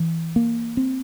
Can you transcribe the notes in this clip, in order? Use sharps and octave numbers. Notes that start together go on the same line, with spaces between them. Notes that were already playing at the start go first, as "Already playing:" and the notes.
Already playing: E3
A#3
C4